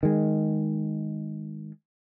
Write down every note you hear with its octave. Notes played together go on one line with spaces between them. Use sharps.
D#3 G#3